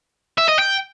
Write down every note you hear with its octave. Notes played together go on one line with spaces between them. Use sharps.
E5
D#5
G5